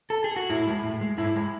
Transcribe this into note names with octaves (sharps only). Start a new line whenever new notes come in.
A4
G#4
F#4
A2 E4
G#3
A2
G#3
G#2 E4
G#3